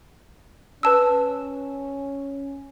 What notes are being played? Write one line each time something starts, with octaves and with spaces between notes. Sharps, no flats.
C#4 B4 A5 E6